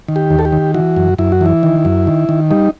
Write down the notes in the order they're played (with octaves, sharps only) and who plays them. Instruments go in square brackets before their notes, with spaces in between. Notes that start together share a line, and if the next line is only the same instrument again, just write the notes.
[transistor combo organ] D#3
G4
D#2
A4
G4
D#3
E3 F#4
F#2
F#2 E4
F#4
E3 E4
D#3
F#2
D#3
D#3
G3 D#4